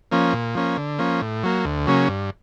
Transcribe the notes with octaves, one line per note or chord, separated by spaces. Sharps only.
F3 A#3 C#4
A#2
F3 A#3 C#4
D3
F3 A#3 C#4
A2
F#3 A#3
D2
C#3 F#3 A#3 C#4
G2